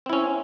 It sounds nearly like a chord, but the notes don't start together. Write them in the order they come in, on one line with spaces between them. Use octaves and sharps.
C4 E4 C#4